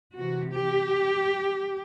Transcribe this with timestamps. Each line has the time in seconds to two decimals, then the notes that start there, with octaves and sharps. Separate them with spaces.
0.16 C3 E3 F#4
0.53 G4